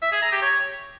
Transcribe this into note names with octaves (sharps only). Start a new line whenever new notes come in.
E5
G#4
A#5
G4
C#5